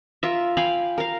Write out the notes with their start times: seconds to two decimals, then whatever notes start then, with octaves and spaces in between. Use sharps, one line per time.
0.23 F4 A#4 E5
0.57 F5 G5 G#5 B5
0.98 A#4 F5